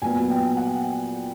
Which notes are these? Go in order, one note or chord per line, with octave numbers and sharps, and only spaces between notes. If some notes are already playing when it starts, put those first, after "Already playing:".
A#2 F#3 B3 G#5
G5
F#5